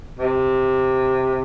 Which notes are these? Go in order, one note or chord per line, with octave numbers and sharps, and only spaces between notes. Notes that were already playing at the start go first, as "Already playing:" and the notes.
C3